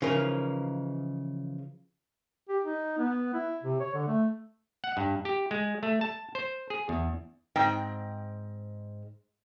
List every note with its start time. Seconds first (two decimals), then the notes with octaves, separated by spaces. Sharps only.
0.02 C#3 E3 F3 D#4 F4 A#4
2.49 G4
2.64 D#4
2.98 B3
3.34 E4
3.63 C3
3.80 C#5
3.94 D3
4.07 A3
4.84 F#5
4.97 G2
5.25 G4
5.51 G#3
5.83 A3
6.01 A5
6.35 C5
6.70 G#4
6.89 E2
7.56 G#2 C4 D#5 G5